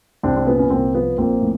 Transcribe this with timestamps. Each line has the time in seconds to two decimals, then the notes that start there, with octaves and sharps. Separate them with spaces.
0.23 C2 C4 D4
0.37 C4
0.47 A#2 B3 C#4
0.59 C#4
0.70 C2 A#3 C4
0.94 F3 B3
1.18 A#1 A#3 C4
1.42 A2